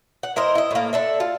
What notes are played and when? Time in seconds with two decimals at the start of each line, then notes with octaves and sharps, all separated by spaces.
0.23 F#5
0.36 E4 A#4 C5 D#5
0.55 E4 D#5
0.71 A2 A#3
0.93 D4 A4 E5
1.20 F4